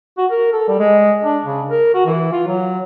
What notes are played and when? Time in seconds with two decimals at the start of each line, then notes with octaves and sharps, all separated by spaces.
0.18 F#4
0.31 A#4
0.53 A4
0.68 G3
0.80 G#3
1.24 D4
1.45 C#3
1.70 A#4
1.94 F#4
2.06 E3
2.33 F4
2.47 F#3